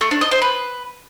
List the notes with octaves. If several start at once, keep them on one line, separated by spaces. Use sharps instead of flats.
A3
D4
D#5
C5
B4